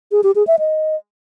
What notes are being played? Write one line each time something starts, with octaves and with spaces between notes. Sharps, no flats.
G#4
G4
G#4
E5
D#5